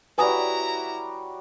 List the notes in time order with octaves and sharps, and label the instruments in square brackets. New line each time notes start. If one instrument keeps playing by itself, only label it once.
[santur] G3 F#4 C#5 [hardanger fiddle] E4 A#5 [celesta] B4 G#5 D#6